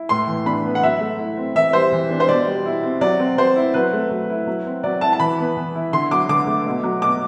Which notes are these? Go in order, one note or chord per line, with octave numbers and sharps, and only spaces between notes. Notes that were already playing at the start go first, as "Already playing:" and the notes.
Already playing: E4
A2 C6
E3
D4 B5
B3
F#5
F#3 E5
A3
E4
C4
E3 E5
G3 C5
E3
D4
C5
B2 D5
G3
E4
C4
F#3 D5
C4
F#3 C5
E4
F#3 B4
A3
F#3
E4
F#3
C4
F#3 D5
E4 A5
A5
E3 B5
B3
E3
E4
D3 C6
F#3 D6
D3 D6
A3
B2
F#3
B2 D6